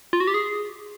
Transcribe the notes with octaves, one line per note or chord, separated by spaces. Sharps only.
F4
F#4
G4
G#4